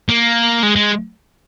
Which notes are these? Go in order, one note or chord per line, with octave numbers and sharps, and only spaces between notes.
A#3
G#3
G#3